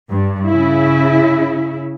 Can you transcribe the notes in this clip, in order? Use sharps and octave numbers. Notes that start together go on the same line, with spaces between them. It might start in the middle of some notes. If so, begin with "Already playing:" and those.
G2
C#3 E4